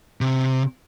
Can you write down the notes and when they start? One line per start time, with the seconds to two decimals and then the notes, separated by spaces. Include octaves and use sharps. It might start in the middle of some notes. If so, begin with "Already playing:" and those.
0.21 C3